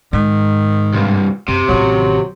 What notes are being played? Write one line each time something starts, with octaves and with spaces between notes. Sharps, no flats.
G#2 D#3
C2 G2
F#2 C3
A1 D#3 F#3